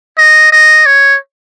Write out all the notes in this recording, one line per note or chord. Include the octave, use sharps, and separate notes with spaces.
D#5
D#5
C#5